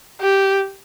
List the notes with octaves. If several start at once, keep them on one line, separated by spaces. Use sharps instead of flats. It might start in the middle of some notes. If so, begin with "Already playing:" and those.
G4